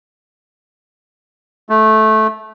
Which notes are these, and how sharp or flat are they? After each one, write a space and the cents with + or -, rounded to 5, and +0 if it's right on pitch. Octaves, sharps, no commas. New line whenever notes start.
A3 -15